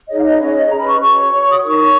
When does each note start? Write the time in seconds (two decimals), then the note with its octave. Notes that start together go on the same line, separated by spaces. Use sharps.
0.08 D#4 G#4 C#5 D#5
0.18 F5
0.23 D#5
0.38 C#4 G#4 B4 C#5
0.54 D#5
0.69 C#4 G#4 B4 A#5
0.79 B5
0.89 C#6
0.99 F#4 C#5 C#6
1.30 F#4 C#5
1.51 D#6
1.60 D#4 A#4 C#5 C#6